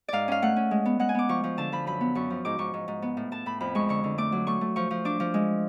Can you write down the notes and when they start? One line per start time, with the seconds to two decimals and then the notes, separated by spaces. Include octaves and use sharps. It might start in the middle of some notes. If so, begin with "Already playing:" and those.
0.08 G#2 D5 F5
0.28 C#4 F5
0.42 A3 F#5
0.56 C#4
0.71 G#3
0.85 B3
1.00 G#3 F#5
1.09 G#5
1.15 B3 D6
1.29 F3 C#6
1.44 F3
1.57 D3 A5
1.72 F3 B5
1.87 F#2 B5
2.01 B3
2.15 F#2 C#6
2.30 F3
2.45 G#2 D6
2.59 G#2 C#6
2.74 G#2
2.88 G#2
3.02 B3
3.17 A2
3.32 A2 A5
3.46 A2 B5
3.61 F2 B5
3.75 G#3 C#6
3.89 D3 C#6
4.04 D3
4.18 A3 D6
4.32 F#3
4.47 A3 C#6
4.61 A3
4.76 F3 C#6
4.91 F3
5.05 D4 D6
5.20 F3
5.34 G#3